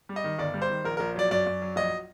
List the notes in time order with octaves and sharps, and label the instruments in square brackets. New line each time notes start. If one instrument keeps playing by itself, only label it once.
[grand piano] G3
D#5
D#3
G1 D5
G3
C5
D#3
A#1 A#4
A#1 A#4
F#3 D5
F#2 D5
F#2
F#3
A#1 D#5